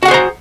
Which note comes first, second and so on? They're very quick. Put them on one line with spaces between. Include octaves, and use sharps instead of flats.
F#4 F#5 G#4 C5 A#5